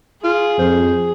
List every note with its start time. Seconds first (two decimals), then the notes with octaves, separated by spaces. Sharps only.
0.24 F4 G#4
0.59 F2 C5